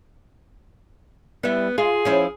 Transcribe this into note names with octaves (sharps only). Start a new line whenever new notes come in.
G3 B3 E4
F4 G#4
F3 C#4 E4